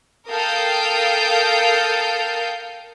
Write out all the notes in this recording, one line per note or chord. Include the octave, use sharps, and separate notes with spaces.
A4 A#4 F5 G5 D#6 G6